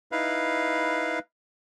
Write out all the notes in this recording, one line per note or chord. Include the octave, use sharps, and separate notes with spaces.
D#4 E4 B4 F5